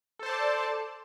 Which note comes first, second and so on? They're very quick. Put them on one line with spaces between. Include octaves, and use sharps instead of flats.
A4 C5 A5 D5